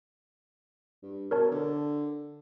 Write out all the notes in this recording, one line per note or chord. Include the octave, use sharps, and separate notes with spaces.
G2
B2 A#4 C#5 A5
D3